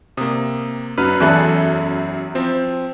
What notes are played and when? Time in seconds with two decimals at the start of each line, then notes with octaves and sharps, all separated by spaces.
0.17 C3 A#3 D#6
0.98 F#2 B4 F6
1.20 E2 G#4 A4 E5 B5 F#6
2.35 F3 C4